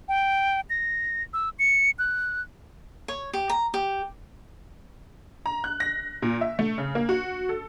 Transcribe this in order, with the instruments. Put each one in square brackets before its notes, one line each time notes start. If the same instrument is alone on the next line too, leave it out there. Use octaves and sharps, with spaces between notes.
[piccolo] G5
A#6
E6
C#7
F#6
[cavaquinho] C#5
G4
A#5
G4
[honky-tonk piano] A#5
F#6
A#6
A#2
E5
A3
C#3
A#3
F#4
A4